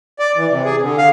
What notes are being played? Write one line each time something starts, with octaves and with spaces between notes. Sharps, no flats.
D5
E3
C3
G#4
D3
F5